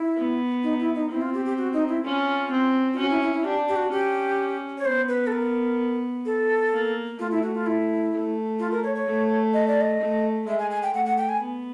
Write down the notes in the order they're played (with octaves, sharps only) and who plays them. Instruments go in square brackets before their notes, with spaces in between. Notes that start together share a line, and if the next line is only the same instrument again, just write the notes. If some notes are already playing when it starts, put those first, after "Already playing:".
Already playing: [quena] E4
[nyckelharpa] B3
[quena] D#4
E4
D#4
[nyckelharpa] C4 [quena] E4
[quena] F4
G4
G4
F#4
D#4
E4
[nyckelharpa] C#4 [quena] F4
[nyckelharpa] C4
[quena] F4
[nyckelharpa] C#4 [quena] F#4
[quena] E4
E4
E4
[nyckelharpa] D4 [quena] G4
[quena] G4
F#4
[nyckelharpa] C#4 [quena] G4
[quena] C#5
[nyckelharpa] B3 [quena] C5
[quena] B4
A4
A#4
A4
[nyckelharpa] A#3
[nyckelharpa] A3 [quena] F4
[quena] E4
F#4
F4
E4
[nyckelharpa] A3
[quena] F4
A#4
C#5
C#5
[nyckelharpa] A3
[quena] D#5
D5
D#5
[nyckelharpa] A3
[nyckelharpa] G#3 [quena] E5
[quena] G#5
G#5
G5
[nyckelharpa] A3 [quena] F#5
[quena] F#5
G5
G#5
[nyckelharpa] B3